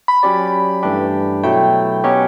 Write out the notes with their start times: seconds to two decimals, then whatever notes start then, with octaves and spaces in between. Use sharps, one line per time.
0.08 B5
0.23 F#3 C#4 G4 D5
0.83 G2 E3 A3 D4 G4
1.43 B2 F#3 A3 E4 G5
2.04 B2 F#3 C#4 G4 C#5